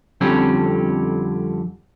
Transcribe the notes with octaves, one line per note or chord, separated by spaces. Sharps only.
F2 D3 G3 C4 C#4